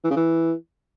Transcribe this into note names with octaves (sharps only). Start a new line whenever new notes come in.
E3
C#3
E3